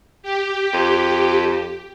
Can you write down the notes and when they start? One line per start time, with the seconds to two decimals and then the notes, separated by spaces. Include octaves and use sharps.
0.23 G4
0.73 F2